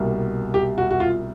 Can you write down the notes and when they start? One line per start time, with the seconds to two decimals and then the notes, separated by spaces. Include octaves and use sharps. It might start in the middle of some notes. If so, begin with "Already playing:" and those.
Already playing: C2 B2 G3 A#3
0.54 G4
0.78 F#4
0.91 F#4
1.00 F4